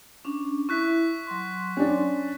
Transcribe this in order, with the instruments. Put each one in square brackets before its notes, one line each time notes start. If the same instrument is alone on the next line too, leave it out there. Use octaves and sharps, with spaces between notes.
[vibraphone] C#4 D4
[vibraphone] E4 E5 [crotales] C#6 F#6 B6
[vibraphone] F#3 C6
[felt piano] C#4 D4